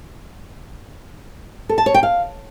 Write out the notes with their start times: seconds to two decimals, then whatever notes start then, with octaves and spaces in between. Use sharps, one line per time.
1.69 A4
1.78 A5
1.86 C#5
1.94 G5
2.03 F5